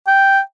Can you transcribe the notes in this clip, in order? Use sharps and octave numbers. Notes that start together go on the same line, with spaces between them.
G5